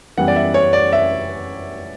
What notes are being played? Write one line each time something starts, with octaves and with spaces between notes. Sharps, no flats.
F#2 E3 G3 B3 F#5
D5
E5
C#5
D5
E5